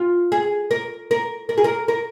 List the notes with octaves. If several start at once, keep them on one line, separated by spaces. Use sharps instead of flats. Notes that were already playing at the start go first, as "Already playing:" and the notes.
Already playing: F4
G#4
A#4
A#4
A#4
G#4
A#4
A#4